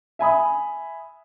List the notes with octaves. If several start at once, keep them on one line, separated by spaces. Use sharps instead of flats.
E5 G#5 B5 D#6